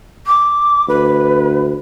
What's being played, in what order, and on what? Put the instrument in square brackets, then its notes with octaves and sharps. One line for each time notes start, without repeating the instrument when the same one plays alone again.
[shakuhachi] D6
[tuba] D2 [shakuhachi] B4